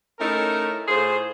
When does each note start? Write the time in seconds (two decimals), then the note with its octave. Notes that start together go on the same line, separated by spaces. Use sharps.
0.20 A3 C#4 D#4 E4 A#4
0.88 A2 F4 G#4 C5